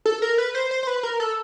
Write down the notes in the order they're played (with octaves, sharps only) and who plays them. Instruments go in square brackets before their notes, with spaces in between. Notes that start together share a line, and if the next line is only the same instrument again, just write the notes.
[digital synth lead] A4
A#4
B4
C5
C5
C5
B4
A#4
A4